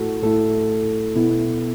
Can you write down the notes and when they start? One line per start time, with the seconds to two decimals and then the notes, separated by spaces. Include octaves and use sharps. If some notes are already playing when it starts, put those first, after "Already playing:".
Already playing: A2 A3 E4 F#4 A4
0.23 A2 A3 E4 A4
1.15 B2 B3 E4